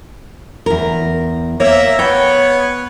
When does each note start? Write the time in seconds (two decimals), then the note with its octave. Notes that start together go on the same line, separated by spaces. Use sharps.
0.66 E2 A#4
1.60 A#3 C#5 E5
1.99 B3 C#5 G5